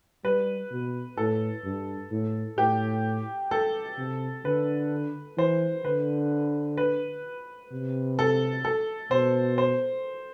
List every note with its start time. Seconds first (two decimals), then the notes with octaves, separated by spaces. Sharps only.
0.25 G3 B4
0.71 B2
1.17 A2 A4
1.64 G2
2.12 A2
2.58 A2 G4
3.51 A4
3.98 C3
4.45 D3 B4
5.38 E3 C5
5.85 D3 B4
6.77 B4
7.72 C3
8.19 A4
8.65 A4
9.11 B2 C5
9.58 C5